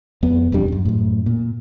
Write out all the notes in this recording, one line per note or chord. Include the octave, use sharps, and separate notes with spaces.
F2 B3
E1 F2 G3 D4
F#2
F#2 A2
A#2